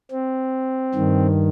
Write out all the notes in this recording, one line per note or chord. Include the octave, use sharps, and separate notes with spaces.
C4
G2 D#3